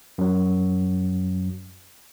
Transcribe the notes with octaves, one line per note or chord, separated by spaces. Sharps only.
F#2 F#3